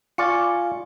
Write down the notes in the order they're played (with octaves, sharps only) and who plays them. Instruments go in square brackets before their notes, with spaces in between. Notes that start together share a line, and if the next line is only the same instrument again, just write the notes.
[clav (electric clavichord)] F4 D5 [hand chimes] G#5 C#6 C#7